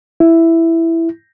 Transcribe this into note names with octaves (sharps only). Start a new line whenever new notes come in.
E4